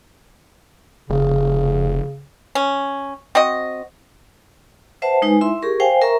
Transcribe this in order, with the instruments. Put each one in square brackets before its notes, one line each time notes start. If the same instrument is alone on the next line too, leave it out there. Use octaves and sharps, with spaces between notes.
[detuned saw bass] F1 [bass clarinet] C#3
[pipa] C#4
C4 F#4 D#5
[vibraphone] B4 C5 E5 F#5 A5
G#3 D#4 B4 G#5
E4 E5 C6
G4 G#4 A#4 C#6
C5 F5 G5 G#5
A#4 E5 A#5 C#6